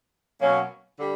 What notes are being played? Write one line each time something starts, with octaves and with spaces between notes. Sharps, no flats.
B2 F#3 A#3 C#4
D3 G3